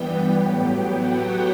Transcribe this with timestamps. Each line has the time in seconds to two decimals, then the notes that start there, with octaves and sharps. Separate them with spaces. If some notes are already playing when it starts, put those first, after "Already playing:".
Already playing: G2 E3 G3 B3 G4 G5
0.32 A2 F#3 B3
0.87 F#4 F#5